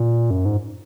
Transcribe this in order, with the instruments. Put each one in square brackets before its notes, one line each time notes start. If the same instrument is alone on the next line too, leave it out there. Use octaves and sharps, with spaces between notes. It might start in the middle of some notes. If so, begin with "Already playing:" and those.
Already playing: [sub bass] A#2
F#2
G#2